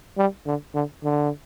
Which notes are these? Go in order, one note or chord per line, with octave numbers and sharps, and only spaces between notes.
G3
D3
D3
D3